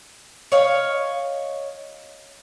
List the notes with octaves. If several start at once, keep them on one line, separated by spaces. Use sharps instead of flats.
C#5 D#5 F5